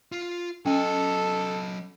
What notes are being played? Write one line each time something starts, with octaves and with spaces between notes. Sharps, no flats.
F4
F#3 C#4 A4 D#5